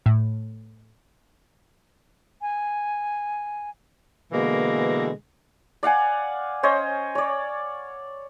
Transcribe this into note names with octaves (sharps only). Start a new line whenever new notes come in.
A2
G#5
B2 D3 E3 G#3 A#3
D5 F5 F#5 G#5
C#4 C5 C#5 D#5
C#5 D5